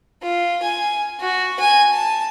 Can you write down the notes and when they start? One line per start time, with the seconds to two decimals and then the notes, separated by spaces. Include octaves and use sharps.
0.22 F4
0.63 G#5
1.20 F#4
1.59 G#5
1.92 A5